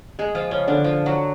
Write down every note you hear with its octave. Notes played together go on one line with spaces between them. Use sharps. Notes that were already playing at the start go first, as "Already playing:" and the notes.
G#3 G#4
F3 F4
C#3 C#4
D3 D4
F3 F4
F#3 F#4